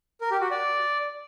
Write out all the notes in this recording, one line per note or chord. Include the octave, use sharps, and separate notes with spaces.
A#4
G4
F#4
D5